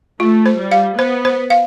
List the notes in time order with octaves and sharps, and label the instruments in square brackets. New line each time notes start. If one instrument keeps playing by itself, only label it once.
[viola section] A3 [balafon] F4
[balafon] C5
[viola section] G3
[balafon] F5
[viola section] B3 [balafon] C5
[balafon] C5
F5